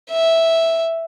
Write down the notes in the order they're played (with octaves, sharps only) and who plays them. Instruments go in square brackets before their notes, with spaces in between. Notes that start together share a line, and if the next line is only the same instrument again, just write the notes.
[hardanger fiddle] E5